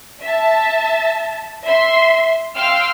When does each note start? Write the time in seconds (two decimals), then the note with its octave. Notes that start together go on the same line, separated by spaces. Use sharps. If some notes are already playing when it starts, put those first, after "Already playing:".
0.23 E5 A5
1.66 E5 C6
2.57 F5 G5 C6 E6 F6